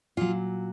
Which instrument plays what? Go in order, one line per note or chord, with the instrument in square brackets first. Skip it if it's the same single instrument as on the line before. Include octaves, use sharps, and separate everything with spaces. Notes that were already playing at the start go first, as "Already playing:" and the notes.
[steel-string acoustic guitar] A#2 F#3 F4